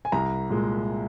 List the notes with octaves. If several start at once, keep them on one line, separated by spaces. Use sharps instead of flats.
G#5
C2 A#5
A#2 G#3